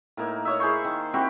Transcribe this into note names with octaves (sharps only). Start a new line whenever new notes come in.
A2 A#3 D#4
C#5 D#5 E5
E4 G#4 C5 C#6
D#3
C4 E4 F#4 G4